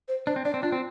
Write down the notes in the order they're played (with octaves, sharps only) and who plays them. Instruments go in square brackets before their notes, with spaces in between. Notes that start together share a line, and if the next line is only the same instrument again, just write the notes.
[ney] C5
[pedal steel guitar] D4 [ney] C5
[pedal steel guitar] C4
[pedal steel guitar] D4 [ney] D5
[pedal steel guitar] C4
[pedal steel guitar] D4 [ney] F4
[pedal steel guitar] C4